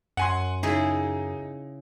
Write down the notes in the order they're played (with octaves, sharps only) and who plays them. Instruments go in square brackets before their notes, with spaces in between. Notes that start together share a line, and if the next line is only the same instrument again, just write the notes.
[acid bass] F#2 [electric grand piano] F#5 G#5 C6
[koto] C#3 E4 G#4 [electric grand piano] D#4